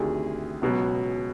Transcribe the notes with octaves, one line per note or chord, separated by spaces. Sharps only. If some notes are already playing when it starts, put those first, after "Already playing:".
Already playing: D2 C3 D#3 G#4
C#2 B2 F#3